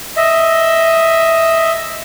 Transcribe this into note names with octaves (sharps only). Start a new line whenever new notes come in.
D#5 E5